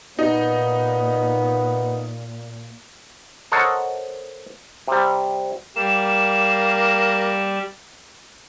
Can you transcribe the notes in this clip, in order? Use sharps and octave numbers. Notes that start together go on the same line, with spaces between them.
A#2 B3 D#4
A4 A#4 C5 C#5 D#5 F#5
C3 G3
G3 A#3 E7